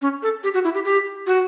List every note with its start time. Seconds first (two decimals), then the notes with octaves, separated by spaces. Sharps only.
0.02 C#4
0.23 A4
0.44 G4
0.54 F#4
0.64 E4
0.74 G4
0.85 G4
1.27 F#4